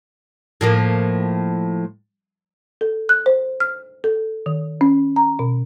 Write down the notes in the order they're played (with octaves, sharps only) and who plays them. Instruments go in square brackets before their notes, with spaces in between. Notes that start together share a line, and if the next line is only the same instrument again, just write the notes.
[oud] A2 F3 A#3
[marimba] A4
F#6
C5
F6
A4
D#3
C#4
A#5
B2